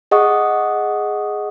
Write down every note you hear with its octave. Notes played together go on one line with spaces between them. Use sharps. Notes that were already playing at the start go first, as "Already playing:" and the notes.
G#4 D#5 F#5 C#6 D#6